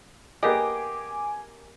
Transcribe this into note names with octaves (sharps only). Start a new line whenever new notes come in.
A#3 B3 G4 G#4 D#5 G#5 D6